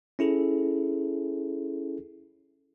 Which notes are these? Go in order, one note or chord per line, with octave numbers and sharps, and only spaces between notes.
C#4 E4 G#4 A4